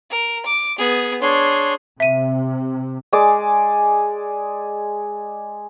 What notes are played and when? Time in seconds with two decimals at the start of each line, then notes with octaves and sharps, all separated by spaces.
0.10 A#4
0.46 D6
0.78 B3 G#4
1.22 D4 G#4 C#5 C6
2.00 C3 E5 D#7
3.13 G#3 G#4 D5 D6